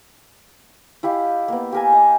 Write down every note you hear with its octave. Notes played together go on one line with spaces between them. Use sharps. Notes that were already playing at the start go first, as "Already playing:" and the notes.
E4 G4 D#5 F5
A#3 B3
G4 A#4 G#5
D#5